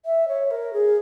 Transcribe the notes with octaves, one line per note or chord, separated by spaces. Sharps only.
E5
C#5
A#4
G#4